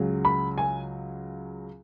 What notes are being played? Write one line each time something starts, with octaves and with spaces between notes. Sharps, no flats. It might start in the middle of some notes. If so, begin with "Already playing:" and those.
Already playing: C#2 C#3 F#3
B5
G#5